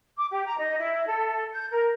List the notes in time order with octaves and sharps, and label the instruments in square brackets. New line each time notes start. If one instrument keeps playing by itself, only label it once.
[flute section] D6
G4
A#5
D#4
E4
A4
G6
A#4